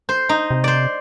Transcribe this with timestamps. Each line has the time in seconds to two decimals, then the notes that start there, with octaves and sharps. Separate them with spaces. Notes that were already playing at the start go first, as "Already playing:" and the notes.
0.09 C5
0.29 D#4
0.51 C3
0.64 C5 D5